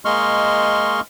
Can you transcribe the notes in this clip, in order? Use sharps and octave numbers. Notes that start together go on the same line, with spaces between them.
G#3 A#3 D#5 C6 C#6 F6